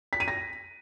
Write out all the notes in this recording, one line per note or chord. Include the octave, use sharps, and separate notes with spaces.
B6
D#7
A#6